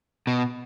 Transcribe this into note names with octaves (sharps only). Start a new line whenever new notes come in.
B2